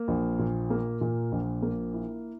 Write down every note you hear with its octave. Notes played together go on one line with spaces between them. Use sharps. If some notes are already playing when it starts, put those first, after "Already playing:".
Already playing: A#3
A#1
A#2
A#3
A#2
A#1
A#3
E4